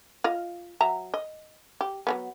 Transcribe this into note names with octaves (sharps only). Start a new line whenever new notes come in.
F4 D#5 F5
F#3 E5 A#5
D#5
G4
F#3 A3 B3